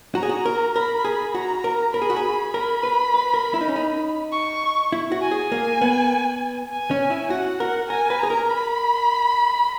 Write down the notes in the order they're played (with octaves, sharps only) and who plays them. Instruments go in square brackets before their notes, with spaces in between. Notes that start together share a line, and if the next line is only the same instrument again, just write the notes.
[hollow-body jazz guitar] F#4 [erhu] A#5
[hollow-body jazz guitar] G#4
F#4
A#4
[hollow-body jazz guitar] A#4 [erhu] B5
[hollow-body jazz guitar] G#4
[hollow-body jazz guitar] F#4 [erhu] A#5
[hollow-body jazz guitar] A#4
[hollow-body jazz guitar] A#4 [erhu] B5
[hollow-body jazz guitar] G#4
F#4
G#4
[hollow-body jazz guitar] A#4 [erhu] B5
[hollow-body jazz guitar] B4
B4
A#4
E4
D#4
C#4
D#4
[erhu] C#6
[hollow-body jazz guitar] E4
F#4
[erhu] G#5
[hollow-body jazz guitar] G#4
A#3
B3
[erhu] G#5
[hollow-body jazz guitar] C#4
E4
[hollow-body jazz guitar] F#4 [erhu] F#5
[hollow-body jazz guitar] A#4 [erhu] F#5
[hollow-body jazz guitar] A#4 [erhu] G#5
[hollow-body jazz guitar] B4
[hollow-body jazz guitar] G#4 [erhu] A#5
[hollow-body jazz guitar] A#4
[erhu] B5